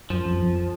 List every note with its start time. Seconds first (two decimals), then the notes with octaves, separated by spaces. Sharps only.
0.10 F#2 F3
0.25 F2
0.42 F2